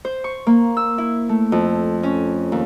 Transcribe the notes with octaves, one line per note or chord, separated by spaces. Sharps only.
C5
C#6
A#3
E6
E4
A3
F2
C#4
D#2